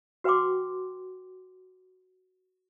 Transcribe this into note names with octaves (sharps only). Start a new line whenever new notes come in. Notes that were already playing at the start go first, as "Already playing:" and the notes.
F#4 B4 F#5 G5 C6 D6